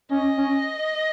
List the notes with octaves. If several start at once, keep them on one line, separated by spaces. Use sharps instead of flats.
C#4 D#5
C#4